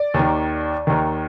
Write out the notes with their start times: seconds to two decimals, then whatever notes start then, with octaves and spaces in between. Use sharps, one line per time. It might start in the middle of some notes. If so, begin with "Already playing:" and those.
Already playing: D5
0.14 D#2
0.19 D#3
0.87 D#2 D#3